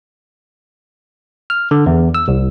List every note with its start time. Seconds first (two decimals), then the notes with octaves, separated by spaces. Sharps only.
1.50 F6
1.71 D3
1.86 E2
2.15 E6
2.28 C2